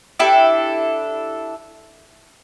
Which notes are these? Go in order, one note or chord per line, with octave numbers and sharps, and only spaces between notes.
D4 E4 G4 A4